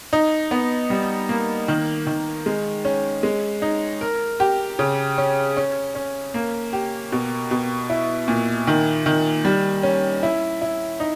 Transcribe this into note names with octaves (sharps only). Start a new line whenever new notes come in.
D#4
B3
G3
A#3
D#3
D#3
G#3
C#4
G#3
D#4
A#4
G4
C#3
C#4
C#4
C#4
A#3
G4
B2
B2
E4
A#2
D#3
D#3
G3
C#4
E4
E4
D#4